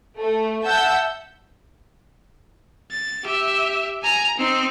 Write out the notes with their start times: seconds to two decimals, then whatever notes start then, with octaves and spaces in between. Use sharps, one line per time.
0.19 A3
0.64 E5 F#5 A5 E6 G6
2.91 A6
3.24 G4 E5
4.03 G#5 A#5
4.38 C4 D#4